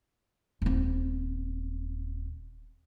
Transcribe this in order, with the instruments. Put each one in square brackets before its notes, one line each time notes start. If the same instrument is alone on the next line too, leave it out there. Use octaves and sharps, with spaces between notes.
[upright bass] D#1 C4